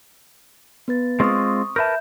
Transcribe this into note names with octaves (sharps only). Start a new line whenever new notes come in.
B3 B4 A6
G#3 C4 F4 C#6 D#6
A#4 B4 E5 A5 G6